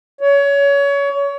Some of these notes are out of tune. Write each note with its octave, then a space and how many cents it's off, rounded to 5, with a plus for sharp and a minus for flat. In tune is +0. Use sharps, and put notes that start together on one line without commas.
C#5 +25